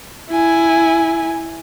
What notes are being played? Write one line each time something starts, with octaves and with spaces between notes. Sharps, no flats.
E4 G#5